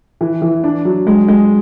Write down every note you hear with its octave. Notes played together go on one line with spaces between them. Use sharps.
E3
E3
D4
F#3
G#3
G#3